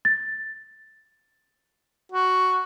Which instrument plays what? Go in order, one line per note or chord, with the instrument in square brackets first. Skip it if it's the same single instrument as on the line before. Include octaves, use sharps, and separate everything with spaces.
[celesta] A6
[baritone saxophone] F#4